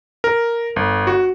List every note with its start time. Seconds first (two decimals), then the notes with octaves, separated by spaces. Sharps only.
0.24 A#4
0.76 G1
1.07 F#4